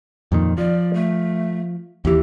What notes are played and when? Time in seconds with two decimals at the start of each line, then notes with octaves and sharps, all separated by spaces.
0.32 F2 A#2 D#3
0.58 F3 D5
0.94 A3
2.05 D#2 E3 G4